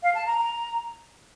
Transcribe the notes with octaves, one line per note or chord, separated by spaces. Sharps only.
F5
A5
A#5
A#5